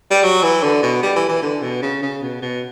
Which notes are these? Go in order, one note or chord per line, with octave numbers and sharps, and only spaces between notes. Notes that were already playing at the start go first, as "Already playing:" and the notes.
G3
F#3
E3
D3
B2
G3
E3
E3
D3
B2
C#3
C#3
B2
B2